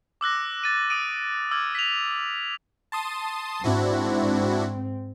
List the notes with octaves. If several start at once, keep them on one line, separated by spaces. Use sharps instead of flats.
D6 E6 F#6 A#6
A6 D#7
D#6 D7 D#7
D6 E6 F6 G#6
B6 F7
A5 C6 D#6
G#2 C4 D4 E4 F#4